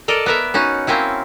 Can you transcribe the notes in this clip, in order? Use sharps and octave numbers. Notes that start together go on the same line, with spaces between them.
A4 A#4 D5 D#5
B3 A#4 E5
C#4 D#4 F#4
A#3 C4 C#4 E4